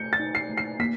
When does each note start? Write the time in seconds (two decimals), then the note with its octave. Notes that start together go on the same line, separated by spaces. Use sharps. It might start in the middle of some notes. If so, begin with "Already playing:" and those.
Already playing: A3 G6 C#7
0.13 A6
0.20 D#4
0.35 C7
0.50 A3
0.57 C7
0.80 A#3 B6